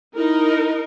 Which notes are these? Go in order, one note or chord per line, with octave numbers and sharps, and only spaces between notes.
D#4 E4 A#4